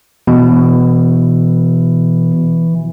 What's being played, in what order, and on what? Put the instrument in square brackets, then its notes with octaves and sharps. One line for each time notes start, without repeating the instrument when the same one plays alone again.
[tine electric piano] B2 [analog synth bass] E3